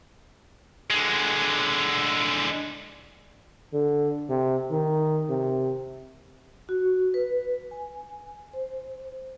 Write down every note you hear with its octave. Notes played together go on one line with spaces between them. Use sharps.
D3 G#3
D3
C3
D#3
C3
F#4
B4
G#5
C5